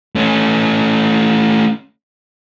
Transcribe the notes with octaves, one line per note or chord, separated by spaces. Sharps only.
A3 C#4